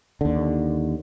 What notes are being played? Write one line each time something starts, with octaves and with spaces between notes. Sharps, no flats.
D#2 D3